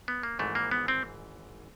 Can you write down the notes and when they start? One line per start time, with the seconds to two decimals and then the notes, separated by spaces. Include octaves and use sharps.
0.08 B3
0.23 A#3
0.39 G#1 G#2 E3 A3
0.55 A#3
0.71 B3
0.88 C4